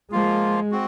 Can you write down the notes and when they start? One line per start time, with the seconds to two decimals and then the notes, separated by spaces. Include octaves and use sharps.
0.12 F3 G#3 A#3 F4
0.72 C4 F#4